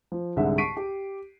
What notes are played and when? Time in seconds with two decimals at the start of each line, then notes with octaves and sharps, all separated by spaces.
0.12 F3
0.36 C2 G#2 D3 E5 F#5
0.58 A5 C#6 B6 C7 D7 D#7
0.77 G4